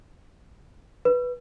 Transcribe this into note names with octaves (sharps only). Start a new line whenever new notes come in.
B4